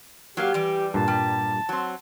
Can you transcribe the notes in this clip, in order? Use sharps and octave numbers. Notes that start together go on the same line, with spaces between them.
F#3 A#3 G4 F5
E3 G3 D5
G2 A#2 A5
G3
F#3 C4